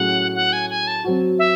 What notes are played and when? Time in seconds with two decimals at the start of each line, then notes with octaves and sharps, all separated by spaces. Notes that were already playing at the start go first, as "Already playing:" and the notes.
Already playing: A2 F#3 C#4 G#4 F#5
0.35 F#5
0.53 G#5
0.70 G#5
0.87 A5
1.04 F#3 C4 F#4
1.39 E5